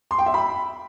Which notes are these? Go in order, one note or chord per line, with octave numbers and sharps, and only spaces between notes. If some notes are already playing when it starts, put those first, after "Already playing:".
C6
G5
E5
B5